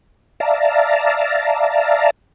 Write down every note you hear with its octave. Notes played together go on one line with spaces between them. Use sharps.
D5 E5 F5 A5 A#5